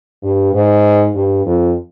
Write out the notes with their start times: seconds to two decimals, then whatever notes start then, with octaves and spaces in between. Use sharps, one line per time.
0.23 G2
0.53 G#2
1.15 G2
1.45 F2